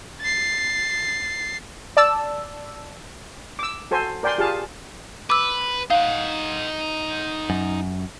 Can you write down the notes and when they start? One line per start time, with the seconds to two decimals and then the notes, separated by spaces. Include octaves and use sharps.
0.21 A6 C7
1.97 D5 A5 E6
3.59 D6 E6
3.91 F#4 A4 C5 G#5
4.23 A#4 D5 G5 G#5 C6
4.38 F4 G4 G#4 F5 A5
5.30 B4 D6 E6
5.90 D#4 F5 F#5
7.50 F#2